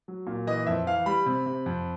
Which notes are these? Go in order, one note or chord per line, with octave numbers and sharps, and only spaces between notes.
F#3
A#2
E3 D#5
F2 E5
E3 F5
G3 B5
C3
C3
F2